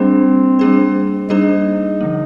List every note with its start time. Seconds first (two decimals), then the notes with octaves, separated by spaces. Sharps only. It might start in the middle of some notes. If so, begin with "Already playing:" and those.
Already playing: G3 A#3 C4 D4 G#4 C5
0.59 G3 A#3 D4 G#4 C5
1.30 G3 A#3 D4 D#4 G#4 C5
2.01 D3 F3 A#3